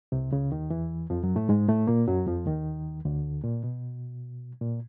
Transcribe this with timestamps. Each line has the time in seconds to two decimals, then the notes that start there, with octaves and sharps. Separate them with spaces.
0.12 C2 C3
0.31 C#2 C#3
0.52 D#2 D#3
0.70 E2 E3
1.10 F2 F3
1.23 F#2 F#3
1.36 A2 A3
1.49 G#2 G#3
1.68 A2 A3
1.87 A#2 A#3
2.08 F#2 F#3
2.26 F2 F3
2.47 D#2 D#3
3.05 D2 D3
3.44 A#2
3.64 B2
4.61 A#2